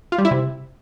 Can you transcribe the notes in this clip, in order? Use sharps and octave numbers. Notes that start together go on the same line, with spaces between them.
F4
G3
E4
C3